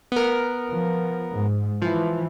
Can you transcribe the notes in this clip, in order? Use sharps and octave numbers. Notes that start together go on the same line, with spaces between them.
B3 A#4
F3
G#2
E3 F3